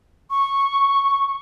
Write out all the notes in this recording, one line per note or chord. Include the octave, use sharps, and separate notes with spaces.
C#6